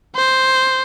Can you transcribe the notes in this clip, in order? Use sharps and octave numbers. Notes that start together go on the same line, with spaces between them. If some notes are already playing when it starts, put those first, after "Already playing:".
C5